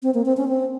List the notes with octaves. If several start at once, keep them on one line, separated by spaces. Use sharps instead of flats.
C4
A#3
C4
C#4
C4